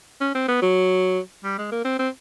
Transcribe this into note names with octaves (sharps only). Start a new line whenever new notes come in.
C#4
C4
B3
F#3
G3
G#3
A#3
C4
C4